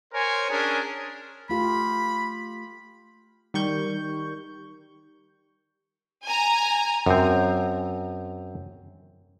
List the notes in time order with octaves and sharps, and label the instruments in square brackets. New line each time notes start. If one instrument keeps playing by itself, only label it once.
[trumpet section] A#4 C5 C#5 G#5
C#4 D4 G#4 A#4
[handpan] A3 F4 G4 [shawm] B5
[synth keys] D#3 G3 C#6 G6
[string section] G#5 A#5
[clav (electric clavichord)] F#2 C4